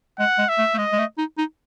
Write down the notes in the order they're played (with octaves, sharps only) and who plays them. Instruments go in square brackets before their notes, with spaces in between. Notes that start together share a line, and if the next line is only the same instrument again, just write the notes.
[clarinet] G#3 [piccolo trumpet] F#5
[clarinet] G#3
[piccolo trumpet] E5
[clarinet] A3
A3
[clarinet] G#3 [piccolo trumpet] D#5
[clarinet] G#3
A3
D#4
D#4